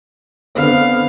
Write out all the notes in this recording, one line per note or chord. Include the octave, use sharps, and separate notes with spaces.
D3 B3 C4 F5